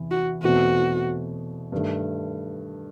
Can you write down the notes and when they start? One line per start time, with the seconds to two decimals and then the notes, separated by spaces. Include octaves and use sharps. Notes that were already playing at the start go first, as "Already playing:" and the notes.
Already playing: E2 C3 E3
0.11 F#4
0.43 E2 B2 A3 C4 F#4
1.72 G2 D#3 A3